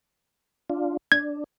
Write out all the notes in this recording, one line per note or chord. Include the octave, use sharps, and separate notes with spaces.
D4 F4
D4 G#6